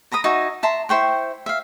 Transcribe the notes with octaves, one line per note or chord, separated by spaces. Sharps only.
A#4 A#5 B5 D#6
D#4 F#4 E5 G#5
E5 A5 A#5 C6
E4 C5 G5 C#6
E5 F5